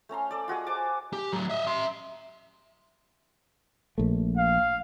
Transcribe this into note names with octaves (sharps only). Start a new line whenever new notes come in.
A3 C#4 A#5 C6
A4 D5
F4 F#4 G#4 D#5
C5 G#5 A5 D6
G4
A2 F#3
D#5 E5
E5 C6
A#1 A3
F5